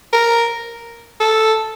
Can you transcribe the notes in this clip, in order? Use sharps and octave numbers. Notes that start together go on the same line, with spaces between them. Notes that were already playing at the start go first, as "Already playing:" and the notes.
A#4
A4